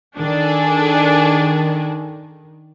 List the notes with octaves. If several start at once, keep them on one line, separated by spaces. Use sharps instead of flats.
D#3 D4 G#4 A4